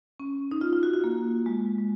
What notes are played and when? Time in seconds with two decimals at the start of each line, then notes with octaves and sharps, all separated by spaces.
0.20 C#4
0.51 D#4
0.61 F4
0.73 F4
0.83 F#4
0.93 F#4
1.04 A#3
1.46 G#3
1.78 G#3